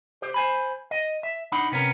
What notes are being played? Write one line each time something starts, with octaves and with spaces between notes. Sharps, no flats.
G4 C5
C5 G#5 B5
D#5
E5
D4 D#4 F#5 B5
C3 B3 C#4 A#4